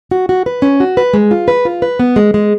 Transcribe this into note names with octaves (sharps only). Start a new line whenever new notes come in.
F#4
F#4
B4
C#4
F#4
B4
G#3
F4
B4
F4
B4
B3
G#3
G#3